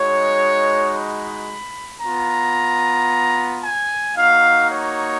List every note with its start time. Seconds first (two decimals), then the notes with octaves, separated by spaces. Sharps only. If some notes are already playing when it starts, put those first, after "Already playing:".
Already playing: G#3 D#4 F#4 C#5
0.94 B5
2.01 B3 F4 A#5
3.62 G#5
4.15 A#3 D#4 F#4 F5
4.69 C#5